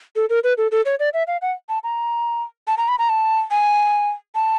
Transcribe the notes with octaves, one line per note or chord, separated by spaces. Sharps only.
A4
A#4
B4
A4
A4
C#5
D5
E5
F5
F#5
A5
A#5
A5
A#5
B5
A#5
A5
G#5
A5